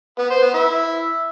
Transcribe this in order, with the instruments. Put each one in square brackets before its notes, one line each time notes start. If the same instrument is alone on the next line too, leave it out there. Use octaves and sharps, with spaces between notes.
[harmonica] B3
C5
B3
E4